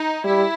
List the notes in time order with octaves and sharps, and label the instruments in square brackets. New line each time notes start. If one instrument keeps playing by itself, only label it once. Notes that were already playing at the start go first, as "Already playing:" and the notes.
Already playing: [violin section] D#4
[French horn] G3 [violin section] E4